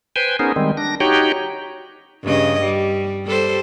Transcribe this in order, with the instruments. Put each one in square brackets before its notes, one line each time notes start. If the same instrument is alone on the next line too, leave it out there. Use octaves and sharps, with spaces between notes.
[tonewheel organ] B4 C5 G5 G#5
B3 C#4 D#4 G#4 A#4 C5
D#3 G3 G#3 C4
D4 A#6
D#4 F#4 G4 C#5 G5
[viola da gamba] G2 C#3 D#5
G3
G3 A4 C5